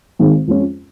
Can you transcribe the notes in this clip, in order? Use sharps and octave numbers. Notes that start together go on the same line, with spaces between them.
G#1 G#2 D#3 G#3 D#4
F2 F3 G#3 C#4 F4